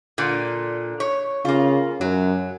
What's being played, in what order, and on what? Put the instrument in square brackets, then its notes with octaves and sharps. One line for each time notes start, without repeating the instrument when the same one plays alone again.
[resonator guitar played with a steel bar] A#2 D3
C#5
[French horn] C#3 [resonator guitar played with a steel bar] A#3 F4
[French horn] F#2 [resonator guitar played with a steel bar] F#3